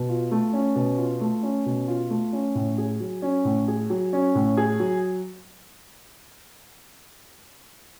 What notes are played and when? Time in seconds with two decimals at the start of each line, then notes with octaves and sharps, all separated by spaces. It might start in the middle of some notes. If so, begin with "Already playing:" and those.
Already playing: B2
0.09 F4
0.31 A3
0.53 C#4
0.75 B2
0.98 F4
1.21 A3
1.43 C#4
1.66 B2
1.88 F4
2.10 A3
2.33 C#4
2.55 A2
2.78 G#4
3.00 F#3
3.22 C#4
3.45 A2
3.68 G#4
3.90 F#3
4.13 C#4
4.35 A2
4.57 G#4
4.80 F#3